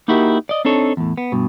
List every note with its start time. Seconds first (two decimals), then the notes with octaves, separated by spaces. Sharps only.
0.08 A#3 D#4 E4 F#4 G4 A#4
0.49 D5 D#5
0.65 C4 D4 D#4 A4 C#5
0.97 E2 A2
1.18 B3
1.32 G2 B2